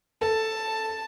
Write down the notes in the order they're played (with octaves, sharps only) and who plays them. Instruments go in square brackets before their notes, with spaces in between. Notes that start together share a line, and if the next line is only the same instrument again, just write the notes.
[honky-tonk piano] A4 [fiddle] A5